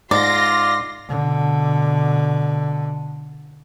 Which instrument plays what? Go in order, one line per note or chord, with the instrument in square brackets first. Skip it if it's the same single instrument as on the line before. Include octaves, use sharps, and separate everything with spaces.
[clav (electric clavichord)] G#2 [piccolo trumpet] F4 [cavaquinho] D5 [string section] C6 A#6
[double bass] B2 D3